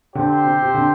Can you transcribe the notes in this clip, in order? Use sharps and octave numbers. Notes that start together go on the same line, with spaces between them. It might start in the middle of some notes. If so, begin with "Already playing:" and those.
D3 C4 G4 C5
C3
C3
D3